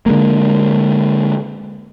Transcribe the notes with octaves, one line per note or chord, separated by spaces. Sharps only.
D3 G#3 A#3